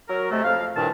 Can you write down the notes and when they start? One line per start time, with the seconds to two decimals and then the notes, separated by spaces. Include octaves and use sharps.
0.09 F#3 A#4
0.31 C3 G#3 A3
0.44 F2 F5
0.76 C2 G2 A#2 D#3 A5